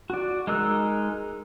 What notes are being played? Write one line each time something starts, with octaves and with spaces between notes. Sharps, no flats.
F#4 D5
G#3 D#4 A#4 E6 F#6